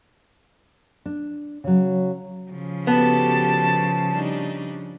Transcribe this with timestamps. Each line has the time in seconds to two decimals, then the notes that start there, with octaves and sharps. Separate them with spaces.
1.06 D4
1.64 C#3 F#3
2.51 C#3 F3
2.87 B3 F#4 G4 A4 A5
4.11 G3 D4 D#4